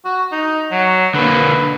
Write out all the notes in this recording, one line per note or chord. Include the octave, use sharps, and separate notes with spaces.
F#4
D#4
F#3
D3 A#3 B4